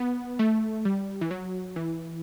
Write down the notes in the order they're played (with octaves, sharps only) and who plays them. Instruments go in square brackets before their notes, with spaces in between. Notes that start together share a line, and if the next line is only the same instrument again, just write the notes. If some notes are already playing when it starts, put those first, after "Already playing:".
Already playing: [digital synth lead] B3
A3
G3
E3
F#3
E3